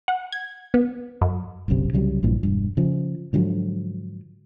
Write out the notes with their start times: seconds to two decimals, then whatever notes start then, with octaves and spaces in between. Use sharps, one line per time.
0.08 F#5
0.32 G#6
0.74 B3
1.21 F#2
1.68 F#1 B1 F#2 C3
1.93 C2 C#3 F#3 G3
2.23 A#1 G2 A#2 E3
2.43 E1 G2
2.77 C#3 F3
3.33 G#2 D3 F3 F#3